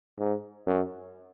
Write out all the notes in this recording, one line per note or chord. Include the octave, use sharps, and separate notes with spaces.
G#2
F#2